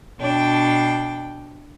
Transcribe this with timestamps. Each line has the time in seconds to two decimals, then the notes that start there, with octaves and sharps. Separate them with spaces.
0.20 B2 D4 G5